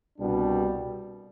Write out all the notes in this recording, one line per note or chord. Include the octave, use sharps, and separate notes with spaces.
C2 B2 G3 D4